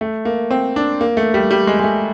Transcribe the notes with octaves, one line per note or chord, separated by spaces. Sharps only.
A3
A#3
C4
D4
A#3
A3
G3
G3
G#3
G#3
A3